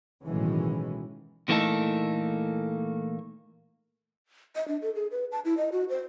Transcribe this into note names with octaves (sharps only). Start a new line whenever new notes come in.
B1 A2 D#3 E3 G#3 C#4
A#2 E3 A3 A#3 D#4 A4
D#5
D4
A4
G#4
B4
A5
E4
D#5
F#4
C5